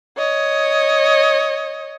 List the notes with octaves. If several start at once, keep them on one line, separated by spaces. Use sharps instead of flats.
C#5 D#5